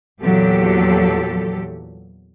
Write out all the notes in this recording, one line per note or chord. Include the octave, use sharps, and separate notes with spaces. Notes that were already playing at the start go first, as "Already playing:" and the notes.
E2 A#2 F#3 G4 A4